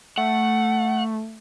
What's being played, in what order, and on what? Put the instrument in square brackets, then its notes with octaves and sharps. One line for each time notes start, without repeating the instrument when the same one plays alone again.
[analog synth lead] A3 [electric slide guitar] F#5